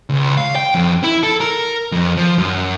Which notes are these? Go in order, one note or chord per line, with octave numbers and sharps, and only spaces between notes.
C#2
F5
G5
F2
E4
A4
A#4
F2
F3
F#2